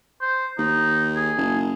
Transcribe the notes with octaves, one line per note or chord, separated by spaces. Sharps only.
C5
D#2 D#4
G#4
F#1